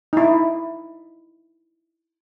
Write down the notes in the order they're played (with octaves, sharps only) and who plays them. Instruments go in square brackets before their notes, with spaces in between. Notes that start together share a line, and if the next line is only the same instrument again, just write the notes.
[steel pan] D#4 E4